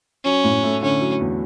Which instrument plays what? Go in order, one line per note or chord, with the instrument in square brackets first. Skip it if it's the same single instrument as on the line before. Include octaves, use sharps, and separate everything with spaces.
[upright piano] F#3 [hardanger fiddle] C#4
[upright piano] A2
A3
[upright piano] D3 [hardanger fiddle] C#4
[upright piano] F#3
E2